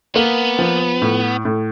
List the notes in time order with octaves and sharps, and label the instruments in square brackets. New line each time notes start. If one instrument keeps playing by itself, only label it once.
[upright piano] A#3 [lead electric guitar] B3
[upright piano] F3
A2
A2